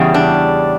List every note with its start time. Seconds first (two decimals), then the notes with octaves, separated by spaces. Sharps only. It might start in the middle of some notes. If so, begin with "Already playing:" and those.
Already playing: E2 C#3 G3
0.14 D4